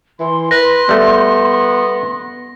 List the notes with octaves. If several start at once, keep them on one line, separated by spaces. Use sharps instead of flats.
E3 C6
B4 A#6
G3 A3 B3